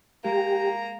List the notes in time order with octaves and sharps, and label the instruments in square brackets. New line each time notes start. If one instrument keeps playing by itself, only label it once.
[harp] G#3 [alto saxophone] A#3 [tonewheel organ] G4 [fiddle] A#5